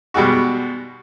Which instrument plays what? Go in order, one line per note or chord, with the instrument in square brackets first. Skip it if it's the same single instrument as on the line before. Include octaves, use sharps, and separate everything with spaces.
[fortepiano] B2 G3 G#3 F#4